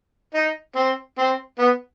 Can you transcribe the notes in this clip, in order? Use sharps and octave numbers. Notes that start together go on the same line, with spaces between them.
D#4
C4
C4
B3